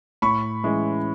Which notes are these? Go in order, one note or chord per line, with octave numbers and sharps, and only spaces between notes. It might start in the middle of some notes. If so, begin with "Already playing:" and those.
A2 B5 C#6
E3 G#3 C#4 E4